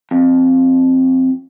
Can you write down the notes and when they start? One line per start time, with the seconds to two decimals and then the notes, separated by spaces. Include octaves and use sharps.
0.11 F2